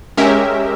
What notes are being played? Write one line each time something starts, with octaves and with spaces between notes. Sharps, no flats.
G#3 C#4 G4 A#4 E5